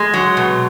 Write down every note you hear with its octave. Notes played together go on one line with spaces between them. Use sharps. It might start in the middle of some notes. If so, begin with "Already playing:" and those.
Already playing: G#3
F#3
B2